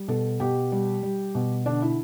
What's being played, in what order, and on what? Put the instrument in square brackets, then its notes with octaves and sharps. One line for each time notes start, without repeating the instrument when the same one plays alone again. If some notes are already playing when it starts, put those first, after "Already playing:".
Already playing: [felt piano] G3
B2 A4
B2 G4
G3
G3
B2
D3 D4
E4